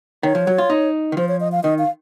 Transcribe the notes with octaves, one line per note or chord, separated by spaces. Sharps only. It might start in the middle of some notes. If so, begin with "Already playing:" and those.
D#3 C#5
F3
F#3
F4
D#4
D#3
F3 C5
C#5
D#5
F5
D#3 D#5
F5